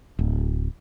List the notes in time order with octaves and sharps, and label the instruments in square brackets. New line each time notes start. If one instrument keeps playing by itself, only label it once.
[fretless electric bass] D1